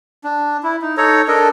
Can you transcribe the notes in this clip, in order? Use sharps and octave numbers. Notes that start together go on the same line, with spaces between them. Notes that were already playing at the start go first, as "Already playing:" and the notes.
D4
E4
D#4
D#4 A4 C#5 A#5
D4 A4 A#4 D#5